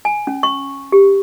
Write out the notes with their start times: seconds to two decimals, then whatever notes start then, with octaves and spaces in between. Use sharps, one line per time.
0.05 G#5
0.27 C#4
0.43 C#6
0.92 G4